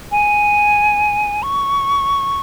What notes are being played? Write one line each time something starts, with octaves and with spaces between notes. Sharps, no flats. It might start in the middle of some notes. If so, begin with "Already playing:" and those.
G#5
C#6